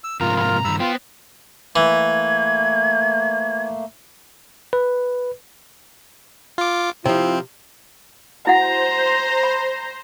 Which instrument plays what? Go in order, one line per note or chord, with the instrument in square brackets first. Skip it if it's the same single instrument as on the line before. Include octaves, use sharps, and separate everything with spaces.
[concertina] E6
[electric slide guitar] G#2 C3 F3 [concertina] F4 A#4 [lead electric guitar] A#5
[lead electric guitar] C#3 A#5
[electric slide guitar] G2 D#3 [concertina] B5 E6
[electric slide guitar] B3 [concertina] F4 [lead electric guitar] C5 G5
[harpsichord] E3 [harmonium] A3 A#3 [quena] G#6
[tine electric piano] B4
[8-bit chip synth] F4 D6
[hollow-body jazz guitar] C3 F3 [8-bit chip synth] C4 [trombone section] E4 F4
[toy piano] E4 F#4 F#5 [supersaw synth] C5 [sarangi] A#5
[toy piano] B5